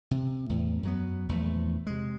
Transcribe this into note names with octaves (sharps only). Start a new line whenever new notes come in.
C3
E2 A2
F#2 F#3 B3
A#1 E2 A3
C3 G#3